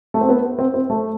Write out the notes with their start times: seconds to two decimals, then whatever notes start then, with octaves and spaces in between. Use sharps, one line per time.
0.14 A3
0.21 C4
0.29 B3
0.59 C4
0.74 C4
0.90 A3